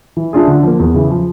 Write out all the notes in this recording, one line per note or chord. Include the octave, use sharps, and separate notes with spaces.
E3
A3 D4 F4 G#4
D3
F3 A#3
E2
C#3 E3
F3